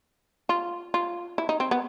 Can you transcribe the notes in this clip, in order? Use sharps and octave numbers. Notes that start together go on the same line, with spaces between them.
F4
F4
E4
D#4
C4
B3